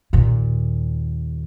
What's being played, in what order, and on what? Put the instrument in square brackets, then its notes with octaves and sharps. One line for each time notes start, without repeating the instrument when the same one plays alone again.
[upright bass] D#2 A#2